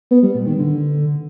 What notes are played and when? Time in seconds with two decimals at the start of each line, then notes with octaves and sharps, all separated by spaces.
0.11 B3
0.23 G3
0.35 A#2
0.47 D#3
0.58 D3